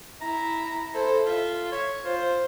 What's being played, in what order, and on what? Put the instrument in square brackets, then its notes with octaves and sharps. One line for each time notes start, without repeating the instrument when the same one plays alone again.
[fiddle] E4 [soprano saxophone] A#5
[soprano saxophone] E4 [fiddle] A4 C5
[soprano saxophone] F4 [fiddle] E5
[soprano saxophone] C#5
[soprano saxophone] F4 [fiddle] C5